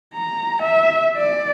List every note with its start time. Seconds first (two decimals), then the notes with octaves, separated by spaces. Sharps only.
0.15 A#5
0.62 E5
1.16 D5